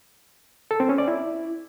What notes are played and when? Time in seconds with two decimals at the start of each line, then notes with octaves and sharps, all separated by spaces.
0.71 A4
0.80 C4
0.89 C#4
0.98 D5
1.08 E4